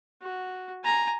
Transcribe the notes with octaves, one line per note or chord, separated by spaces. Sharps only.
F#4
G#5 A#5